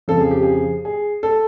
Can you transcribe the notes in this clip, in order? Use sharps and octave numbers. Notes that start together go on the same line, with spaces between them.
F2 C#3 F3 A4
G#4
G4
G#4
G#4
A4